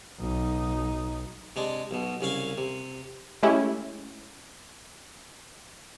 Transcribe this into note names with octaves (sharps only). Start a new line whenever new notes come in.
B1 D#4
C3 G#3 D4
B1 B2
C2 C#3 C#4 F5 G#5
C3
G#3 A3 C#4 E4 G4